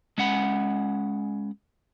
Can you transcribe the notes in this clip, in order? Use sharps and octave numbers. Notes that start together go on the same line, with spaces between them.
G#3 C#4 F#5 B5